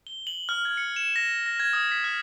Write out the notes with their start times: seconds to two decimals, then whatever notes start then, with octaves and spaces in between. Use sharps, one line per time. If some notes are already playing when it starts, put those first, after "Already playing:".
0.07 G7
0.27 F#7
0.49 F6
0.65 G#6
0.77 C#7
0.96 E7
1.16 A#6
1.46 A#6
1.60 G#6
1.73 D#6
1.91 B6
2.04 F6